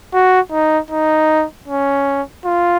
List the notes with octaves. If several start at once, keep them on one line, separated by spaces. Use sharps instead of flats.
F#4
D#4
D#4
C#4
F4